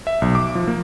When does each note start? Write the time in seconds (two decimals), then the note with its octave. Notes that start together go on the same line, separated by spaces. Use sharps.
0.07 E5
0.22 B1
0.35 D6
0.55 F3
0.68 A#3